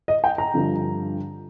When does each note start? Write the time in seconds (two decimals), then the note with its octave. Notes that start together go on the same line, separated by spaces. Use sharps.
0.08 D#5
0.24 G5
0.38 A#5
0.54 G2 D3 F3